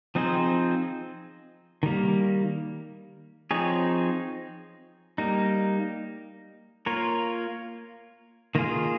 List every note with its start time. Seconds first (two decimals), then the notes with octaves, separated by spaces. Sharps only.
0.15 F3 C4 D#4 G#4 C5
1.83 D#3 G3 A#3
3.51 F3 C4 D#4 G#4 C#5
5.18 G3 A#3 D#4
6.86 A#3 F4 A#4 C#5
8.55 D#3 A#3 F4 G#4